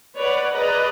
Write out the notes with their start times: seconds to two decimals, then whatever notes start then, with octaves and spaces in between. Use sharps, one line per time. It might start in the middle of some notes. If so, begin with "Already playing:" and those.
0.17 B4 C#5 D5 F#5
0.53 G#4 B4 D5 D#5 A#5